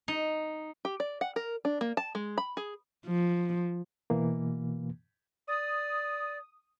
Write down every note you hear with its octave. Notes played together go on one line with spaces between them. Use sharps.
D#4
G4
D5
F#5
A#4
D4
A#3
A5
G#3
B5
G#4
F3
B2 E3 A#3
D5 D#6